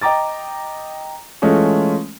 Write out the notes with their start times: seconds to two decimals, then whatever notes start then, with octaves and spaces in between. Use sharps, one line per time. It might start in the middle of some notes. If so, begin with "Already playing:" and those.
0.02 D#5 G5 A#5 D6 A6
1.42 E3 G#3 A3 C#4 F4